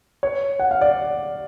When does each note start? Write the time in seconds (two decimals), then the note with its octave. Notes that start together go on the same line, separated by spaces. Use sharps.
0.23 C#5
0.59 F#5
0.71 F5
0.81 D5